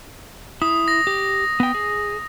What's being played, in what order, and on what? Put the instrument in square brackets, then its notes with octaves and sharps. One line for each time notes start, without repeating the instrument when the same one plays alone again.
[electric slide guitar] E4 [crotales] D#6
[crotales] A#6
[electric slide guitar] G4
B3 G5
G#4